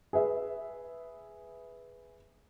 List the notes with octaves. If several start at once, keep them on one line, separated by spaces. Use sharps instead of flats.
G#4 B4 E5